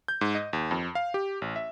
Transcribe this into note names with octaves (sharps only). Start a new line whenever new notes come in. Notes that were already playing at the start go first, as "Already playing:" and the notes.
G6
G#2
D#5
D#2
F2
F5
G4
A1
E5